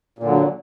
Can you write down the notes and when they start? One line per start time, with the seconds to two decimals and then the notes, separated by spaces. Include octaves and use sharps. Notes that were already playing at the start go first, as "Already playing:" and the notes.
0.19 A#2
0.23 D3
0.28 F#3